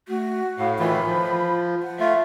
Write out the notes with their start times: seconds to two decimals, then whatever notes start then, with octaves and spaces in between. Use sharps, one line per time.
0.08 A3 F#4
0.59 A2 F5
0.79 A2 D#3 E3 F4 B5
1.06 F3
1.83 F#5
2.00 A3 F4 E5